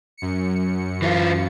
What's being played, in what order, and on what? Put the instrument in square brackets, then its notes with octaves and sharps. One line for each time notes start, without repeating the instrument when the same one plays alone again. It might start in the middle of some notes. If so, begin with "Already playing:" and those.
[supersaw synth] F#2 C#7
[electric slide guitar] E3 E4 F4